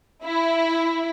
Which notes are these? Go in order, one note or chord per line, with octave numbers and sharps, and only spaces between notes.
E4